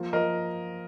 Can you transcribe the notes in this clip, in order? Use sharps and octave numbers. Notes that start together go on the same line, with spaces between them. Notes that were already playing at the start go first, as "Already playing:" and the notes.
Already playing: F3 A#3
F3 A#4 D#5